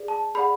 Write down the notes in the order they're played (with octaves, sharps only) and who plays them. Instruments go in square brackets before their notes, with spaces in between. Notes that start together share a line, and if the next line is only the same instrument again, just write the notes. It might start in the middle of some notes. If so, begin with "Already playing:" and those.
Already playing: [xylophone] G#4 D5
A5
G#4 D5 F#5 B5